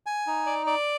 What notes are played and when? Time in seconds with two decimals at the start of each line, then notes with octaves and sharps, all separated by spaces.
0.06 G#5
0.27 D#4
0.46 D5
0.66 D5